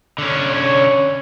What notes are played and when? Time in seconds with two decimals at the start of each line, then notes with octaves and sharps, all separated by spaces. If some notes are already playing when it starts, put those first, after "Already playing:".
0.18 D3 C#4
0.50 C#5